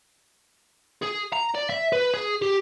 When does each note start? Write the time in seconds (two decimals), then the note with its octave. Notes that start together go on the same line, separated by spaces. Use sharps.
1.02 G#4
1.33 A#5
1.55 D5
1.70 E5
1.93 B4
2.14 G#4
2.42 G4